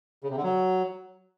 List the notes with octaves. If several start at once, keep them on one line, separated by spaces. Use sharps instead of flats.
C#3
C3
D3
F#3